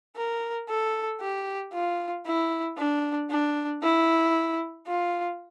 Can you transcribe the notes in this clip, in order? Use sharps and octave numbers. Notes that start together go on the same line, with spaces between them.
A#4
A4
G4
F4
E4
D4
D4
E4
F4